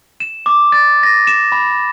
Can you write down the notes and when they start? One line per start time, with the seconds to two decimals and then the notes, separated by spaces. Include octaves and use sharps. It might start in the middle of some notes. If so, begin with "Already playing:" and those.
0.20 E7
0.46 D6
0.72 A6
1.03 A#6
1.27 E7
1.52 B5